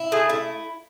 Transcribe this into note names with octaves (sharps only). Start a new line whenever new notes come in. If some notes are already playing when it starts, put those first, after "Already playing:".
Already playing: E4
A3 G#4
E4